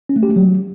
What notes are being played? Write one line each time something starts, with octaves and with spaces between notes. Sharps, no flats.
C#4
A3
G4
A3
F#3